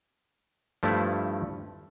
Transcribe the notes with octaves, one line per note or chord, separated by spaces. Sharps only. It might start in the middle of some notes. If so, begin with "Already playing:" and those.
G2 F3 A3 E4